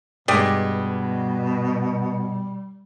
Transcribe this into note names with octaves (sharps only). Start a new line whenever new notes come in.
G2 B2 G3 G#3 G4 D5 D#5